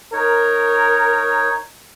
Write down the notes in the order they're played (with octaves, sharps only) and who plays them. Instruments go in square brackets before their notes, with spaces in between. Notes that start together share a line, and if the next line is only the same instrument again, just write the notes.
[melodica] D#4 C#5 [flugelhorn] A#4